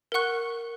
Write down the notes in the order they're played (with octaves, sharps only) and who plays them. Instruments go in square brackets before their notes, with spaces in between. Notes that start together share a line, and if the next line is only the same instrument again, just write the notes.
[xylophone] A#4 F#5 C#6 F#6